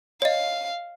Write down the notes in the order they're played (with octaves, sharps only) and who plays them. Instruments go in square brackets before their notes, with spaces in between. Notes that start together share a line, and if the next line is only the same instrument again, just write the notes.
[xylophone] C#5 D#5 [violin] F5